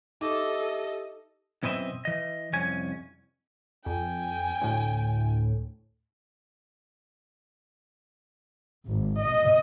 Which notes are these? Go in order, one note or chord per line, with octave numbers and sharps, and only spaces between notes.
D#4 E4 G4 A4 D#5 E5 C#6 D6
F#2 B2 E3 C4 D#5 E5
E3 D#5
C2 F2 C#4 G#5
F2 G5 G#5
D2 A2
G#1
D#5